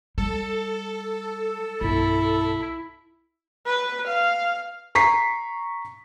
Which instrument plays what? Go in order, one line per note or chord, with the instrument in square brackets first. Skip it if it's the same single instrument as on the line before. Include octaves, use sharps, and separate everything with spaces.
[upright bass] G3 [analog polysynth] A4
[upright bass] B1 G2 [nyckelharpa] E4
[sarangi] B4
F5
[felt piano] A#5 C#6 B6 C7